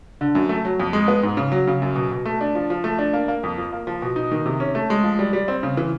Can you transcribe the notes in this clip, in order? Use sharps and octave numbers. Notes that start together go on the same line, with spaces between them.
D3
F#2
A3
F#3
F2
G#3
B3
G#2
C#3
F#3
C#3
F#2
B2
B2
A3
D4
F3
F3
A3
D4
A#3
A#3
F2
F3
A#3
F3
B2
D#4
D#3
C3
C#4
A3
G#3
F3
G3
G3
C4
C#3
E3